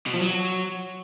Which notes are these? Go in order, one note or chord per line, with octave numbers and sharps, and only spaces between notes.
B2
F3
F#3